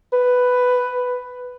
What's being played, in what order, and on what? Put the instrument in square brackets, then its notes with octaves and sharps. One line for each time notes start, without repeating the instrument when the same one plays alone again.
[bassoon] B4